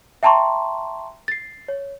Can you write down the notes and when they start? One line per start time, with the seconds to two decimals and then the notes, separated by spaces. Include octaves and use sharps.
0.23 E5 G5 A5 A#5 C6 C#6
1.28 A6 C7
1.68 C#5